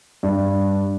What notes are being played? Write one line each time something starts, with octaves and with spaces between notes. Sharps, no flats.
G2